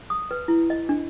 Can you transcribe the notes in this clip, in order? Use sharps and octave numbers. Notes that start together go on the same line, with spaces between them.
D#6
B4
E4
D#5
D4